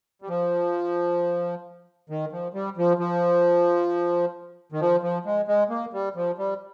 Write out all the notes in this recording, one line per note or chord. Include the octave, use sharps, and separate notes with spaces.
G3
F3
D#3
F3
G3
F3
F3
D#3
F3
F3
G#3
G#3
A#3
G3
F3
G3